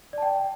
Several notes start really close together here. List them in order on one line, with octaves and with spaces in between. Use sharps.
D5 A5 G5